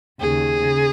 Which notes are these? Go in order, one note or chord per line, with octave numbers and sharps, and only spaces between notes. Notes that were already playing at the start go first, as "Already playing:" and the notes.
D#2 C#3 G#4
C#3